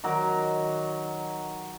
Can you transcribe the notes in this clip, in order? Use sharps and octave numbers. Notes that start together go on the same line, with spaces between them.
D#3 F#3 A#5 D6